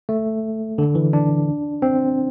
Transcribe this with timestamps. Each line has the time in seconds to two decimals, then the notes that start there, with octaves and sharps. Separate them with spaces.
0.09 A3
0.78 D3
0.95 E3
1.13 D4
1.82 C4